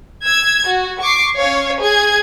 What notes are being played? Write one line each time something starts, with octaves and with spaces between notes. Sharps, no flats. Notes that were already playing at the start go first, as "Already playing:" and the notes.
E6 G#6
F#4
C#6 D6 C7
C#4 C#5 F5
G#4 G#6